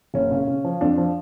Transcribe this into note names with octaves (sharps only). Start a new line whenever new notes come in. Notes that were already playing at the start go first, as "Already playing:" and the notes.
F#1 C#4
C#3
C#3
F3
F2 D4
F3